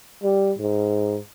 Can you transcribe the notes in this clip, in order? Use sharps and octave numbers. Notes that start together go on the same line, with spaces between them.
G3
G#2